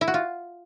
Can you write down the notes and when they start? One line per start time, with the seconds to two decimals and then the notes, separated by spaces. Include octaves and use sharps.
0.01 E4
0.08 F#4
0.14 F4